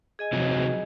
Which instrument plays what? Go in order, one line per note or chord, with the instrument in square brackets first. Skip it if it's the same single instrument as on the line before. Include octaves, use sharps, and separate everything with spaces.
[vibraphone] G#4 D#5 G#5
[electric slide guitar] C3 F3 F#3